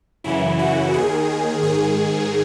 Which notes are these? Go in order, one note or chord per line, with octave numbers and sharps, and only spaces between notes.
F#2 C#3 E3 E4
F#4
D#2 D#3 G#4
G#2 D#3 G#4